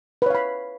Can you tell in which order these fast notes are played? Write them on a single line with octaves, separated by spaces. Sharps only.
B4 C#5 F5 B5